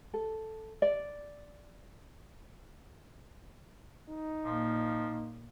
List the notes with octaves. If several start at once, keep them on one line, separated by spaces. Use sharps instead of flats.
A4
D5
D#4
A#2 F3 A#3